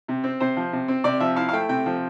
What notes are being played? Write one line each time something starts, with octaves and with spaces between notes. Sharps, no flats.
C3
C4
C3 C5
F3
C3
C4
C3 D5
F3 E5
E4 F5
F5
A3 G5
C3 G5
F3